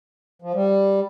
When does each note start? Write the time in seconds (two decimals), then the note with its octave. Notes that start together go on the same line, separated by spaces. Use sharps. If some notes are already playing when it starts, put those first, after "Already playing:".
0.42 F3
0.54 G3